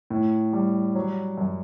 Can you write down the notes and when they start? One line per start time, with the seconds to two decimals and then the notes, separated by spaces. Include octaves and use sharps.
0.10 A2
0.53 G3
0.95 F#3
1.38 F#2